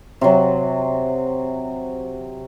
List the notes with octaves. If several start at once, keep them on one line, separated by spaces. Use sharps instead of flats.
C3 F#3